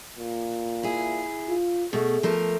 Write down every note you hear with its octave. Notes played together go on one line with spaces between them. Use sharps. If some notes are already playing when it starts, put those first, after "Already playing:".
A#2
E4 G#4
F4
B2 A3 G#4
F3 A3 A#4